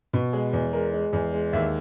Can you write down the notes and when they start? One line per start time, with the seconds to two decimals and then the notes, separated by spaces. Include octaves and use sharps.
0.13 B2
0.33 G#3 G#4
0.53 E2
0.73 G#3 A#4
0.93 G#3
1.13 E2 G#4
1.33 G#3
1.53 D#2 E5